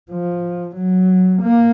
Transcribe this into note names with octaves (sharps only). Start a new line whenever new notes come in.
F3
F#3
A#3